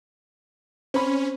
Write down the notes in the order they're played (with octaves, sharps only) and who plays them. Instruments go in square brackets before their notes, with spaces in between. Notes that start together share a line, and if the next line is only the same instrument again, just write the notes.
[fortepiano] C4 B5 [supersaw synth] C#4